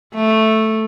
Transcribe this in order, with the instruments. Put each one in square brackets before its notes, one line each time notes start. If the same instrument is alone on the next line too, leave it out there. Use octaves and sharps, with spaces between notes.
[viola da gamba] A3